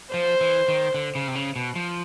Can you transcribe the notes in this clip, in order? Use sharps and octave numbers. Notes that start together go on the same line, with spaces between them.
F3 C5
E3
D#3
D3
C#3
C3
C#3
B2
F3